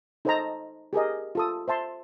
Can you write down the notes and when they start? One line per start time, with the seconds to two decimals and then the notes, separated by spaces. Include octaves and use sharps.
0.25 D#4 A4 C5 D#5 A5 A#5
0.93 G4 G#4 A#4 D#5
1.35 F4 A4 D#6
1.68 C5 E5 A5 C6